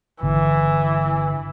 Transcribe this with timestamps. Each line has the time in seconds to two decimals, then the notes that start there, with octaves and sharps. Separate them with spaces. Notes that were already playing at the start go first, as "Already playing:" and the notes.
0.22 G1 D3 E3